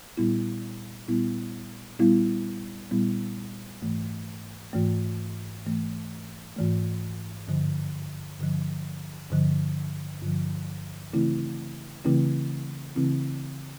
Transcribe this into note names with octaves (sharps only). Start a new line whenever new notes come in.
A#2 G3 B3 E4
A#2 G3 B3 E4
A#2 G3 B3 E4
A#2 G3 B3 E4
G#2 E3 A3
G#2 E3 A3
G#2 E3 A3
G#2 E3 A3
G2 D3 F3
G2 D3 F3
G2 D3 F3
G2 D3 F3
C#3 E3 A3 C4 E4
C#3 E3 A3 C4 E4
C#3 E3 A3 C4 E4